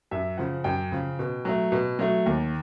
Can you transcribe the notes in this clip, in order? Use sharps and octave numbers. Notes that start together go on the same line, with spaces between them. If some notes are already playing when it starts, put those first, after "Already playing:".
F#2 E5
C#3 F3 F#5
F#2 G5
C#3 F3
B2
F#3 A3
B2
F#3 A3
D#2